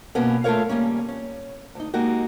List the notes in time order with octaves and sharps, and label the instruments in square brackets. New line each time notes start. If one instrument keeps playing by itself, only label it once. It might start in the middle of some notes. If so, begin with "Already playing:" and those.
[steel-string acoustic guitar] G2 B2 A#3 B3 C#4
A3 F4 G4 A#4 C#5 F5
C#3 F3 G3 A#3 C#4
C#4
D2 D#4
G#3 A#3 D#4 F#4 G4